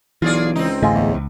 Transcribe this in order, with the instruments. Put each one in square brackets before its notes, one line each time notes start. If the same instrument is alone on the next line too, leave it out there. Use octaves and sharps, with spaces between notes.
[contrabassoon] B1 [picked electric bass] E3 [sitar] F4 G#4 D5
[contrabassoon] C#2 [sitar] C4 D#4
[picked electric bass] A1 D2 A2 [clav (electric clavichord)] G#3 F4
[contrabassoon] E2
[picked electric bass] C#2